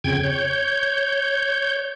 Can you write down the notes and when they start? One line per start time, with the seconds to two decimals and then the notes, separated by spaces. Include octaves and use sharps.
0.04 F2 C#3 G5 G#6
0.24 C#5 G6